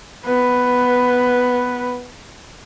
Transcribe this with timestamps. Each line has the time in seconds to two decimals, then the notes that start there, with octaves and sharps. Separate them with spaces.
0.25 B3 B4